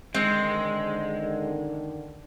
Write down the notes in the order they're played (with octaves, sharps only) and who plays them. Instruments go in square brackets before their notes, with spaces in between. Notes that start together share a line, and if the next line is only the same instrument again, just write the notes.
[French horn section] D3 D#3 [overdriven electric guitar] G#3 [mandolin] C4